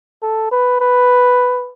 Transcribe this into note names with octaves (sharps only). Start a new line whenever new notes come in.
A4
B4
B4